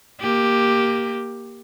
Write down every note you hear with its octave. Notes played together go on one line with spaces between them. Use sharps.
A#3 G4